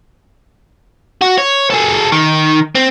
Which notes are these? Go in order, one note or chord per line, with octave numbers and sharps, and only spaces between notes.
F#4
C#5
G#4 A4
D#3
C4